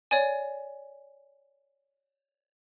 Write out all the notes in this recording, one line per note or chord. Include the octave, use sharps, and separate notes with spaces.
C#5 D5 G#5